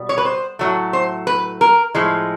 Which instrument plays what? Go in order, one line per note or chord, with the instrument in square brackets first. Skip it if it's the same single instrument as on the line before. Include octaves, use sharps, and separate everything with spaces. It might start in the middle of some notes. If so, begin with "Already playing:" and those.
Already playing: [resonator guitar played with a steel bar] B2 G3
C#5
B4
C5
A2 F#3 A3
C5
B4
A#4
A2 F3 G#3